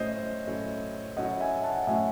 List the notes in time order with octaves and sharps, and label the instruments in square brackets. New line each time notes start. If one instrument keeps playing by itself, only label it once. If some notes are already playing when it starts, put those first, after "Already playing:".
Already playing: [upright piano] A2 F#3 A3 C#4 [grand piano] C5 D#5
[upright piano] A2 F#3 A3 C#4
[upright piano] A2 F#3 A3 C#4 [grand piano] D#5 F#5
[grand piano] E5 G#5
F#5 A5
[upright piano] A2 F#3 A3 C#4 [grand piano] E5 G#5